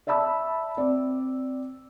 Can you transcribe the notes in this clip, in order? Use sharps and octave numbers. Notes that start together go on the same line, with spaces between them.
D5 E5 A5 B5 E6
C4 D5